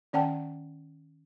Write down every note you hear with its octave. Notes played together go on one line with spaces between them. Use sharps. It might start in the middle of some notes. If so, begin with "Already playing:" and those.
D#3 C#4 D5 F#5 G5 A5